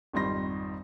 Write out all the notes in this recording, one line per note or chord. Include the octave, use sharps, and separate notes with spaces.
G#1 F2 G3 D#4 C6 A#6